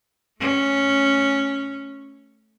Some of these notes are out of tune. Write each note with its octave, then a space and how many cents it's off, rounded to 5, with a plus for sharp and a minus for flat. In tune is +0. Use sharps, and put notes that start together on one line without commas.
A3 +0 C#4 +0